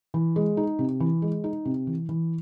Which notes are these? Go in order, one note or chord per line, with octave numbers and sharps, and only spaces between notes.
E3
G#3
D#4
C3
E3
G#3
D#4
C3
E3
E3